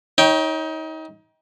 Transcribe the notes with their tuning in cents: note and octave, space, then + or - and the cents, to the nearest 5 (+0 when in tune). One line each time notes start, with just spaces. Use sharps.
D#4 +30 C#5 +0 G5 +0